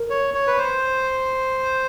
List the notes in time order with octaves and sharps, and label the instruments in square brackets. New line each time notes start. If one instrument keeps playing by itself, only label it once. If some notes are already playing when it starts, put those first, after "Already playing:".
Already playing: [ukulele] A#4
[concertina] C#5
C#5
B4
C5